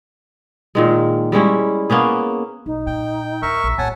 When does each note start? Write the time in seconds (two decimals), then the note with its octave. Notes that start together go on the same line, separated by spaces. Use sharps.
0.75 A#2 D#3 G#3
1.32 G3 G#3 C#4 E4
1.90 A#3 B3 C#4 G#4
2.66 B1 D#4
2.87 A#2 G5
3.42 D#2 A#4 E5 C#6
3.64 A#1
3.78 D1 B3 C#5 F#5 G#5 A5